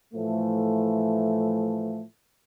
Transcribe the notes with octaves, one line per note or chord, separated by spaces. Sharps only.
A2 E3 F3 A3